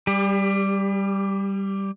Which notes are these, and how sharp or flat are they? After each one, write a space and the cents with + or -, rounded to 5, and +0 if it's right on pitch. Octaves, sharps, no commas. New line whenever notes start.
G3 +0 G4 +35